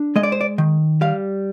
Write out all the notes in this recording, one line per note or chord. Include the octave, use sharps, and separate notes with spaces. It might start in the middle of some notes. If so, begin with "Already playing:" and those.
Already playing: D4
G#3 D#5
D5
C5
D5
D#3
G3 F5